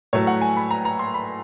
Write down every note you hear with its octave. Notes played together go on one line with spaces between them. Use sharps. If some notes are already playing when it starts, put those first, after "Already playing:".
A2 F#3 A3 C#5
F#5
G#5
B5
A#5
A#5
C6
B5